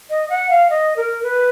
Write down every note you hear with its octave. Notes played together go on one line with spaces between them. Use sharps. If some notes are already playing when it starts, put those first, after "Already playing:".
D#5
F#5
F5
D#5
A#4
B4